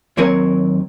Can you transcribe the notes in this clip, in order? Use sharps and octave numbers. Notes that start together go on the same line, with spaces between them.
D#2 F#3 C4 A#4 C#5 G#5